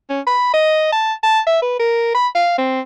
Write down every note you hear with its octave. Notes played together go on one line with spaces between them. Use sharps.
C#4
B5
D#5
A5
A5
E5
B4
A#4
B5
F5
C4